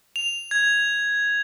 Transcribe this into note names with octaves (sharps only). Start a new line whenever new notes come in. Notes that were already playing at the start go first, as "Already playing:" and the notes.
F7
G#6